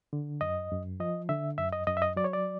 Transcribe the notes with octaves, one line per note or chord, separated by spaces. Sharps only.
D3
F#2 D#5
F#2
F3 D#5
D3 E5
F#2 E5
D#5
F#2 D#5
E5
D#5
F#3 D5
C#5
D5